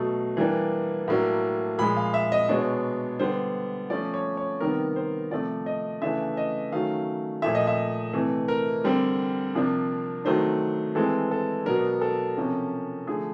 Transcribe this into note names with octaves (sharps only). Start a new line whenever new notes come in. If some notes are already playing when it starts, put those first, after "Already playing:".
Already playing: B2 F#3 A3
E3 G3 A#3 D4
A2 F#3 A#3 D4
A#2 F3 G#3 B5
F5
E5
D#5
B2 G#3 B3 D4 C#5
D3 G3 B3 C5
F3 A3 C#4 D5
C#5
C#5
C3 D#3 G3 B3 A#4
C5
C3 F3 A3 D5
D#5
C#3 E3 A3 D4 E5
D#5
D#3 F#3 A3 C#4 F5
A#2 F3 A3 E5
D#5
E5
C3 E3 A3
A#4
D3 G3 C4
C3 F3 A#3 D4
D#3 F#3 A3 D4 C5
E3 G#3 C4 A4
A4
B2 F#3 B3 D4 A#4
A4
C3 F3 A#3 C#4
D3 F3 A3 G#4